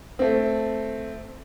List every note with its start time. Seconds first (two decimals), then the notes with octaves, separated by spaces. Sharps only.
0.19 A3 C4